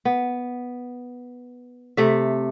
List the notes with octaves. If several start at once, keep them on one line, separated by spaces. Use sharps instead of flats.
B3
C3 A3 E5